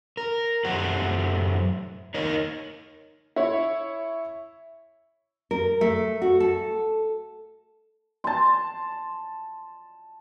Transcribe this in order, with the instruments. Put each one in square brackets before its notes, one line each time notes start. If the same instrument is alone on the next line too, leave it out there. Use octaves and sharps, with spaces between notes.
[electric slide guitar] A#4
F#2 A3 G4 C5 F#5
D#4 A#4 C#5 D#5
[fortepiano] E4 C#5
[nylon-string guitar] A#4
A3
F#4
A4
[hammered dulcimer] A5 C6